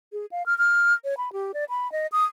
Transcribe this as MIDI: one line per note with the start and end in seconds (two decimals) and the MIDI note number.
0.13 0.26 68
0.31 0.45 77
0.46 0.56 89
0.58 0.93 89
1.04 1.14 73
1.17 1.32 83
1.33 1.52 67
1.54 1.64 74
1.69 1.90 83
1.92 2.07 75
2.12 2.24 87